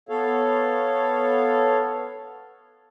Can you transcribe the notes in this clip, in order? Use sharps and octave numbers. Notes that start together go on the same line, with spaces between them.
B3 A4 C#5 F5